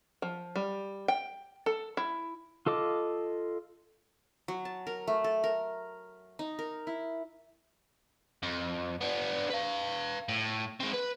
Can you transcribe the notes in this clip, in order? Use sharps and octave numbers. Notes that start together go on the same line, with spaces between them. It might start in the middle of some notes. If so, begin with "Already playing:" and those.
F3
G3
G5
A4
E4
F4 A4 D#5 D6
F#3
A5
A#4
A3
A4
A#4
D#4
A#4
E4
F2
B3 D4
B4 F5
A2
G#3 C4
B4